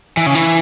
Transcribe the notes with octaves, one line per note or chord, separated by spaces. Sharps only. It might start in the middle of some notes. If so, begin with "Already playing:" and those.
E3
C#3
E3